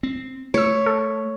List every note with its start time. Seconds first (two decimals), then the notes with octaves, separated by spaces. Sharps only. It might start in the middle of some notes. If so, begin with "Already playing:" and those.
0.03 C4
0.54 A3 C#5 E6 C#7
0.86 A4